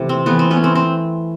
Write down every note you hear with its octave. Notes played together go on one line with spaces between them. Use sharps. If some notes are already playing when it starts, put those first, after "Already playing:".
Already playing: C3 E3 A3
C4
E3 A3 B3
C4
B3 C#4
C4
C4